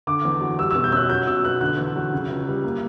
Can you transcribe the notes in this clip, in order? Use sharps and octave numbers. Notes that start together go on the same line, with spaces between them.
D3 D6
E2
F#3
G3 E6
B2 E6
G6
C#4 E6 F#6
F#3 G6
B2 E6
B3 F#6
D3 F#6
E2
F#3
C#3
C#2
G3
A#3